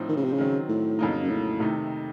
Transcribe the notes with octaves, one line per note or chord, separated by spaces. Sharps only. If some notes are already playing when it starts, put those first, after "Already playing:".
Already playing: A2 F3 C4 D#4
D#3
C#3
C3
C#3
D#3 F#3 C4
A2
F2 C#3 F#3 A#3 D#4
F#2
A2
C3 D#3 A3 D#4